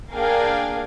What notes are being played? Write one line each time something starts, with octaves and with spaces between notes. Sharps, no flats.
A#3 D4 G#4 A#4 F5 G5